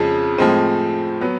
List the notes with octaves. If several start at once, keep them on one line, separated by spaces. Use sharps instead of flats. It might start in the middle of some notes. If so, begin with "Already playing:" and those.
Already playing: F2 C#3 F3 G#3
A2 F3 G#3 C4
F#3 B3